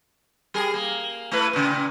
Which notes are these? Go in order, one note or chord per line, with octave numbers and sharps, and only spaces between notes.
G3 G#4 A#4
A#3
A3 E4 B4
A#2 C#3